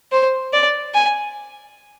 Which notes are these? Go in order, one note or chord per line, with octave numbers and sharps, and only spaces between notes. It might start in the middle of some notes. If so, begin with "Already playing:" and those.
C5
D5
G#5